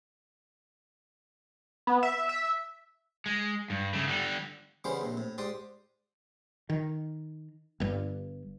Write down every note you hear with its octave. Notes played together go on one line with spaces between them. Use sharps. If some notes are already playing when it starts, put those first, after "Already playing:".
B3
E5
E5
G#3
G2
C#3 A3
D3 G3
C#3 E3 G3 B3 C#4 C5
A#1 C3
A2
G#2 G4 D5 C6 D#6
D#3
G1 G2